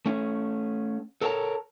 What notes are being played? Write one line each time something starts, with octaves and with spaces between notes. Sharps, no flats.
A3 C#4
A4 A#4 C#5 F5 A5 A#5